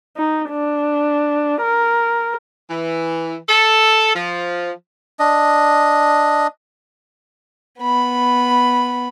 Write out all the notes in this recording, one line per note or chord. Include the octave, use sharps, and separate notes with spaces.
D#4
D4
A#4
E3
A4
F3
D4 D#5
B3 B5